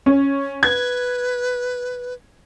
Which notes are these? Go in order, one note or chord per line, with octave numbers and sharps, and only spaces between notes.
C#4
B4 G#6